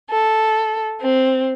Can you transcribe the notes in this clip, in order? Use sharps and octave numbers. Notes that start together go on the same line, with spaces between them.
A4
C4